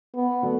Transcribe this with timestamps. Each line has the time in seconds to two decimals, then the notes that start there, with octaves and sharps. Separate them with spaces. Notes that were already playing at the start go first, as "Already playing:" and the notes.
0.15 B3
0.42 D3 F#3 A3